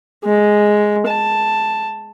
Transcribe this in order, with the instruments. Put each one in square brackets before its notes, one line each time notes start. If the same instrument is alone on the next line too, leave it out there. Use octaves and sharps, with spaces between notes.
[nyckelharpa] G#3
A5